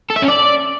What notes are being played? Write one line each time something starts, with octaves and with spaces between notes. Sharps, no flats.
A4
E5
C#4
D5